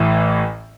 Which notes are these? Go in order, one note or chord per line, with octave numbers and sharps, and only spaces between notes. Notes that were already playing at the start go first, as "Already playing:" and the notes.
Already playing: A1 A2 E3